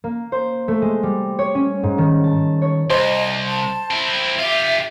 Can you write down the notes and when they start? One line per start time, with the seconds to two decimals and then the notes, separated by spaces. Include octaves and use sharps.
0.04 A#3
0.32 C5
0.68 A3
0.82 G#3
1.03 G3
1.39 C#5
1.55 C#4
1.83 G#2
1.98 D#3
2.24 A5
2.62 C#5
2.90 C2 C5 D#5
3.48 A5
3.91 C4 E4
4.40 F4 G4 E5